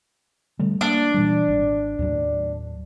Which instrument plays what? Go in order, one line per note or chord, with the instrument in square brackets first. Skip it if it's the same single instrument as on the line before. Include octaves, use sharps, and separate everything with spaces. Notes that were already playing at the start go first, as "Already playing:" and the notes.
[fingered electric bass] D3 G3 A3
[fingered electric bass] A#3 [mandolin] D4
[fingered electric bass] A#2 E3 G3
G#1
D#2 A2 F#3